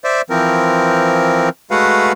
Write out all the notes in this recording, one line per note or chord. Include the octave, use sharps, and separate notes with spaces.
C5 D5 E5
E3 F3 C4 A#4
G#3 A3 F#4 B4 F5 F#5